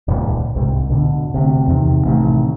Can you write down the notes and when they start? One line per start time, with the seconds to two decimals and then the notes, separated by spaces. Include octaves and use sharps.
0.08 D#1 C#2 G#2
0.56 C2 G#2
0.90 D2 B2 D3
1.34 D2 C3
1.68 E2 C3 D#3
2.05 A1 C3 D#3 A3